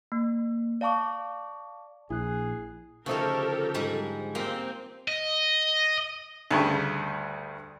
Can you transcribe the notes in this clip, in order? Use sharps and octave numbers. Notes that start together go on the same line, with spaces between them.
A#3
D5 F5 A5 C#6 D6
A#1 E4 G#4 F#6 C7
D2 C#3 F3 D#4 G4 A4 A#4 C#5
G#2 G3 G#3
A#3 C4 F4 G4
D#5
D2 G2 C#3